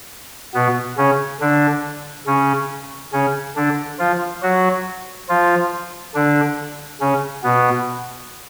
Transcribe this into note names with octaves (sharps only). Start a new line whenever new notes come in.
B2 B3
C#3 C#4
D3 D4
C#3 C#4
C#3 C#4
D3 D4
F3 F4
F#3 F#4
F3 F4
D3 D4
C#3 C#4
B2 B3